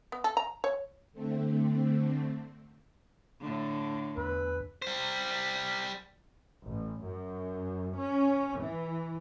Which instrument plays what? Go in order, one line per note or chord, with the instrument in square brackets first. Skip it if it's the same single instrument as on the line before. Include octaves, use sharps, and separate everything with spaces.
[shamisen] B3
A4
A#5
C#5
[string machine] D3 A3 C4
[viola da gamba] A2 D3
[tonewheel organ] E2 [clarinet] B4
[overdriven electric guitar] G3 C5
[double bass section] A1
F#2
C#4
E3